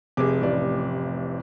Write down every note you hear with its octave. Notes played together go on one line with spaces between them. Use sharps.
F1 C3 G#4 D6
A1 C3 D5